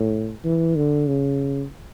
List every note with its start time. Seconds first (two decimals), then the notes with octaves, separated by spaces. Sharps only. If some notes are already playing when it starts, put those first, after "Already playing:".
Already playing: A2
0.45 E3
0.76 D3
1.07 C#3